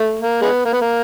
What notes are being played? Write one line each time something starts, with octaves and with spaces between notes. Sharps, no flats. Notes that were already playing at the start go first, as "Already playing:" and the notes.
Already playing: A3
A#3
G#3 B3
A#3
B3
A#3